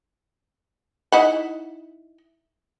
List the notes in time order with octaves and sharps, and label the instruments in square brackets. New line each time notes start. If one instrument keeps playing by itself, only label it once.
[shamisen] D#4 E4 F#5